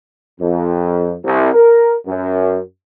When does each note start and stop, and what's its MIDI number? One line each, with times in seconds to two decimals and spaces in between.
0.40 1.15 41
1.24 1.49 36
1.54 1.95 70
2.06 2.59 42